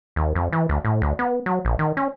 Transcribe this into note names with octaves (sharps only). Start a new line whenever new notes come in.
D#2
F2
E3
D2
A2
D2
B3
F#3
A#1
D#3
C#4